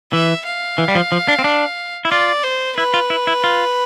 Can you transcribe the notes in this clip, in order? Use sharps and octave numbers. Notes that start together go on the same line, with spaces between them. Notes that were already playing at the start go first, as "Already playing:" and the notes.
E3 E5
F5
E3
G3
F3
F3
D4
C4
D4
E4
F4 D5
C5
E4 B4
F4
E4
E4
F4